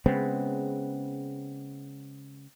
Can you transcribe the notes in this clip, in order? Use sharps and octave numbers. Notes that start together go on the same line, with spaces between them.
C#3 G#3 B3 C4